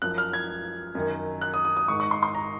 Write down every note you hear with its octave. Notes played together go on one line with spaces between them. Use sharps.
F#2 F3 F#6
F6
G#6
F#2 D#3
F#6
D#6
D#6
D#6
G#2 D#3 C#6
C#6
C6
C6
A#5